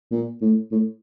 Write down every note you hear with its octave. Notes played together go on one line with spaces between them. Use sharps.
A#2
A2
A2